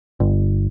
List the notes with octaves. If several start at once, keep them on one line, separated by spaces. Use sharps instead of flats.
G1